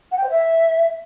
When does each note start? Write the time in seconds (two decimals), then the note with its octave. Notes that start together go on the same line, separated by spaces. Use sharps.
0.11 F#5
0.17 G5
0.24 C5
0.30 E5